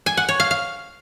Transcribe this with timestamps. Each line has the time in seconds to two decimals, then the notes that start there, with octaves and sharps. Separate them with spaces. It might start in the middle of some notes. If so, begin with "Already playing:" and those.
0.06 G#5
0.17 F#5
0.29 C#5
0.40 F5
0.51 F5